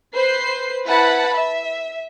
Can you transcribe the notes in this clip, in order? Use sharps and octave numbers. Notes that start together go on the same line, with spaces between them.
B4 C5 C7
E4 B4 F#5 A5 B5
E5